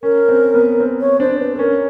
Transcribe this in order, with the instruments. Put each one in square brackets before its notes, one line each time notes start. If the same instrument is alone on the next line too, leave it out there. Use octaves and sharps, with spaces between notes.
[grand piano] C#4 [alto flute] A#4
[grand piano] C4
B3
C4
[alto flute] C#5
[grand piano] D4 [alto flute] C5
[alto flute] B4
A4
[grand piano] C#4 [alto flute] A#4